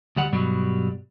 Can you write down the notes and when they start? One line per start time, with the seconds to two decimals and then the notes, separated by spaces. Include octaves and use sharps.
0.16 D2 G3 F#5
0.32 G2 B2 F#3 G3